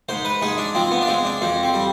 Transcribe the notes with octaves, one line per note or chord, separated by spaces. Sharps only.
G#2 C5
B4
G#2 G#4
D4
F3 C4
B3
D4
G#3 C4
D4
F2 C4
C4
G3